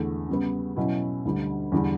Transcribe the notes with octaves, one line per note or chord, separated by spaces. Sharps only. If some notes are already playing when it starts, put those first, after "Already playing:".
Already playing: E2 D3 A3
C#3 G3 B3
B2 F#3 C#4 E4
D2 D3 G3
E2 D3 G3 D4